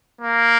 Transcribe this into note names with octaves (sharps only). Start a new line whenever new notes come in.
A#3